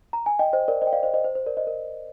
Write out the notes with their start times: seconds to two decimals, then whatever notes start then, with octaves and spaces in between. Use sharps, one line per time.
0.13 A#5
0.26 G#5
0.39 D#5 G5
0.53 C5 D#5
0.68 A#4 D5
0.82 C5 D#5
0.87 G5
0.92 D5 F5
1.03 C5 D#5
1.14 C5 D#5
1.24 C5
1.35 C5
1.46 A#4 D5
1.57 C5 D#5
1.67 A#4